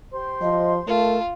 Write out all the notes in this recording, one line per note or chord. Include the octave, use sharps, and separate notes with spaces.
G4 C5 C6
F3 D#5
A3 F4 A#4 F5 A5